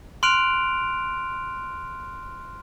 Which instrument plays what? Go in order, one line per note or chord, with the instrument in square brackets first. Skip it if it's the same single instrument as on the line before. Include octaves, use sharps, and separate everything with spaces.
[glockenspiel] C6 F6 F#6 D7 F7